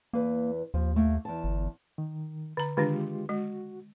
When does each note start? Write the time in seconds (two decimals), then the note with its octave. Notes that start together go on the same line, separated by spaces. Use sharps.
0.13 E2 A#3 B4
0.74 D#2 F3
0.96 A3 A#3
1.25 E2 A5
1.44 G1
1.98 D#3
2.57 D3 A#5
2.77 D3 D#3 G#3 D4 F4 G4
3.29 G#3 F#4